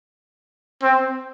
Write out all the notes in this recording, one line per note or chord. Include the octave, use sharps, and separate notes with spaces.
C4